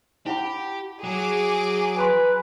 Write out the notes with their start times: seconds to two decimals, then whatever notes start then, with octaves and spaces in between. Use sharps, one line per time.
0.27 E4 G4 F#5 B5
1.04 F#3 G#4 D6
1.96 B4 G#5 A#5 C6